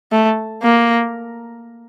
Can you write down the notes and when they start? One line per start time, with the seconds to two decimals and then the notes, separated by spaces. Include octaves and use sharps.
0.12 A3
0.63 A#3